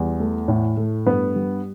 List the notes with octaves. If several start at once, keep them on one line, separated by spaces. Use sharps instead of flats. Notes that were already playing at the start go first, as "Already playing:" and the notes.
Already playing: E2 G3
A3
A2
A3
G2 B3
G3